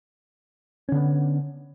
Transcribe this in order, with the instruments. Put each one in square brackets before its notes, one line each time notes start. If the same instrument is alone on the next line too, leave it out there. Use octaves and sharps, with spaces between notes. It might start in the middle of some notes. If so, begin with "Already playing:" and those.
[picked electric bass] C#4
D3
B3